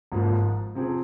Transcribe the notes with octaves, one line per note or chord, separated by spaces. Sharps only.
G#1 G#2 F3 A#3 F4
C3 F3 C4 G#4